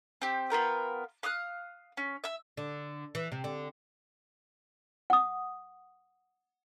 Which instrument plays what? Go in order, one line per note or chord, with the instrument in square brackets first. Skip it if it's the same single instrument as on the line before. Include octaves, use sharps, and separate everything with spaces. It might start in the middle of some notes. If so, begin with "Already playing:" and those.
[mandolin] C4 G4
B3 F4 A#4 G5
F5 D#6 F6 F#6
C#4
E5 E6
[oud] D3
E3
C3
D3
[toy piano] F#5 D#6